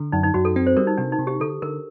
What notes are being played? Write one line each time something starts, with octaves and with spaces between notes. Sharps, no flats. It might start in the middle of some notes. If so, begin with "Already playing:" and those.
Already playing: D3
F#2 D#4
D#4
F#2 F#4
A4
C4
C5
G3 A#4
D#4
C3 D4
D#4
C3
G4
D3 A4
D3 A#4